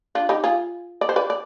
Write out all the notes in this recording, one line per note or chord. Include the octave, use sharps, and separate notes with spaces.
D4 F4
D#4 G4
F4 G#4
D5
C5
B4 D5
D5